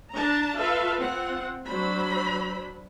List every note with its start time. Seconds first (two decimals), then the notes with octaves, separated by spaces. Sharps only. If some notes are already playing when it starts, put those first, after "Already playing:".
0.11 D4 A5 A#5
0.57 F4 A4 B4 E5 F5
0.98 C4 F4 F#5
1.67 F#3 D4 C5 B5